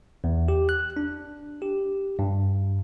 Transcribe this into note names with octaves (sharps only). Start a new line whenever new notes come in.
E2
G4
F#6
D4
G4
G2